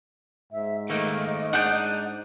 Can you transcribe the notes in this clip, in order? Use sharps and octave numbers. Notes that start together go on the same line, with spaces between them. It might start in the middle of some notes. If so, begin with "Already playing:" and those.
G#2 E5
D#3 A3 A#3 D#5
G#2 D4 D#4 F#5 G6